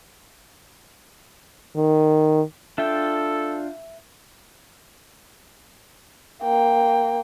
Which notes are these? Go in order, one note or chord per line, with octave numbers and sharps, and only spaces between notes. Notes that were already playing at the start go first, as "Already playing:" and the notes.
D#3
D4 F4 A4 E5 G5
A#3 G5